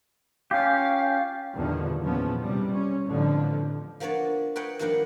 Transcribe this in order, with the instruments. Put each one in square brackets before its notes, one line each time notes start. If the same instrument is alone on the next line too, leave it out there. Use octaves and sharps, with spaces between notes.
[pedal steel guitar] C#4 F4 G4 [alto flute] F5
[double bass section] E2 G2 A#2 D3 D#3 F3
F#1 E2 A#2 F3 B3 C#4
C3 G3
C#4
A1 F2 D3 F3
[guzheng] F3 A#3 B3 D4 C#5 D5
A#4 B4 C#5 D#5 F#5 G5
G2 D#3 F3 A#3 D4 F#5